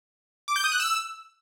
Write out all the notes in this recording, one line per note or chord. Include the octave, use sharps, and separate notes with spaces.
D6
G6
D#6
F#6
E6